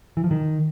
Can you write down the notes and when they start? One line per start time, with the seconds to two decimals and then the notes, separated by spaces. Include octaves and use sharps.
0.17 E3
0.24 F3
0.31 D#3